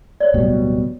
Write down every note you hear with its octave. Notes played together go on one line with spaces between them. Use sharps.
C#5 D5
D1 B2 G3